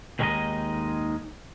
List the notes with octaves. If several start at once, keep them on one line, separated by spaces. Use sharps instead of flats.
D#2 D#3 G#3 C4 D#4 D#5